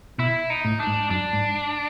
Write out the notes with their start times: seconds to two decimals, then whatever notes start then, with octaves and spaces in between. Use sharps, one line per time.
0.18 B2 E4
0.50 D#4
0.65 A2
0.80 D4
0.87 G#2
1.10 F#2 D4
1.33 G#2